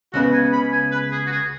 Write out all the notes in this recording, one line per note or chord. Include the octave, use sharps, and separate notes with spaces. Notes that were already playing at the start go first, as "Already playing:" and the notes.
C#2 C#3 B3 F#4
G#5
B5
G#5
B4
G#4
F#4
G#4